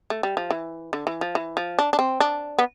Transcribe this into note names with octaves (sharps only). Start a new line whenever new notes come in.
A3
G3
F3
E3
D3
E3
F3
E3
F3
D4
D4
C4
D4
B3